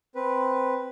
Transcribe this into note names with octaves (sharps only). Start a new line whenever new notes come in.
C4 B4